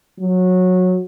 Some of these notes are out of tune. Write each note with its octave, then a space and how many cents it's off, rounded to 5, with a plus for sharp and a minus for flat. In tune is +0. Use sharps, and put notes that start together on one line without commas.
F#3 -20